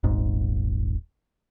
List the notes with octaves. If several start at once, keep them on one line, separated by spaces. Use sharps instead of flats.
D#1 G#1 G#2